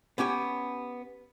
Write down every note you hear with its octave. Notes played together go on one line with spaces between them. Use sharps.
B3 C#4 G4 G#5